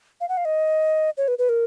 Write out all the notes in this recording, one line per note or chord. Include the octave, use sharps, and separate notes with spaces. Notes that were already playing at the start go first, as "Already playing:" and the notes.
F5
F#5
F5
D#5
C#5
B4
B4
A#4